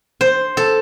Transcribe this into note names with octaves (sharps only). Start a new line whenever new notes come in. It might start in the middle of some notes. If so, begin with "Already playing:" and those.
C5
A4